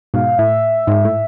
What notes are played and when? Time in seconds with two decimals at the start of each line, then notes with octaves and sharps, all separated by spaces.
0.14 G#2 B2 F5
0.39 A2 E5
0.87 G#2
1.05 A2